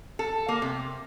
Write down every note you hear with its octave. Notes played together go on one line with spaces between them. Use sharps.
A4
A#3
C3